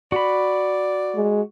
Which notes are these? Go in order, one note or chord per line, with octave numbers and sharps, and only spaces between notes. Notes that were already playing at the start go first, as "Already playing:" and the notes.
F#4 D5 B5
G#3